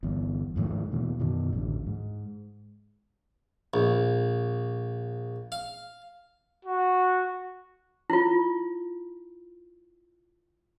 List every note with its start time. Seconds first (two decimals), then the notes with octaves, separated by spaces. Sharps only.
0.03 G1 E2
0.56 F2 G#2 D#3 A3
0.91 D#2 B2 E3
1.19 F#2 B2 D#3
1.53 A1 D2
1.86 G#2
3.74 A#1
5.52 F5
6.65 F#4
8.10 E4 F4